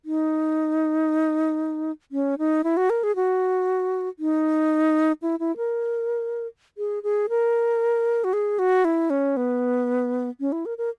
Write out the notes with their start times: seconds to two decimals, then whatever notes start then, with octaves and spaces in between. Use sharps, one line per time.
0.05 D#4
2.12 C#4
2.39 D#4
2.64 E4
2.77 F#4
2.90 A#4
3.03 G#4
3.16 F#4
4.19 D#4
5.22 E4
5.40 E4
5.57 A#4
6.78 G#4
7.03 G#4
7.29 A#4
8.24 F#4
8.33 G#4
8.59 F#4
8.85 E4
9.10 C#4
9.37 B3
10.40 C#4
10.52 E4
10.66 A#4
10.78 A#4